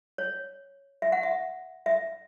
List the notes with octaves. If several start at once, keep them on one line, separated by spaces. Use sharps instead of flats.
C#5
E5
F#5
E5
E5